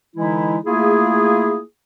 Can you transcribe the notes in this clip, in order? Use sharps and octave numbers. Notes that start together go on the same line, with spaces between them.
D3 E3 G#3 D#4 E4
A3 A#3 E4 F4 G#4